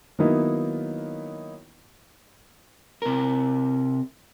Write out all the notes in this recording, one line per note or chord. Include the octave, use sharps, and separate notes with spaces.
D#3 F#3 A#3 B3 D#4 E4
C3 A#4